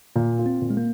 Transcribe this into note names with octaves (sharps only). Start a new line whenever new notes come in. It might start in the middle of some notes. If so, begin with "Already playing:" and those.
A#2 A#3
F4
C4
A#2
G#3
A#3